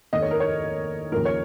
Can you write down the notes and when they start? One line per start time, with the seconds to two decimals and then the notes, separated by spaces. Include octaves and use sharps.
0.13 F1 D#2 D#3 D#5
0.22 C#5
0.31 A#4
0.40 C#5
1.12 D#2 C#3 F3 A#4
1.25 C#5